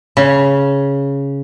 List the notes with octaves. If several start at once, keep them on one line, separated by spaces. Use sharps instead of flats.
C#3